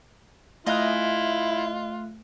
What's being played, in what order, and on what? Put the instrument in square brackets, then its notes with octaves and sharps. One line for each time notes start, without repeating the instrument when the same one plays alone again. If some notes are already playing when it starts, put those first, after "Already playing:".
[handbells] A3 F#6 [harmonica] E4 [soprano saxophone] F4 [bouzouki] D#5 F5 G#5